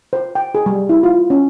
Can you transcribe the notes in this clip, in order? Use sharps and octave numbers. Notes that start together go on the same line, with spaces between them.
C5
G5
G#4
G3
E4
F4
C#4